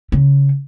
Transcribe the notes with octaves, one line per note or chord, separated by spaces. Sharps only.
C#3